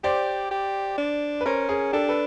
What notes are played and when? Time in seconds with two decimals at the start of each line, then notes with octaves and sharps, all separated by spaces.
0.03 G4 C5 D5
0.51 G4
0.98 D4
1.41 B4
1.46 C#4 A#4 C5
1.69 G#4 A#4
1.93 D4 G4 A4
2.08 A4 B4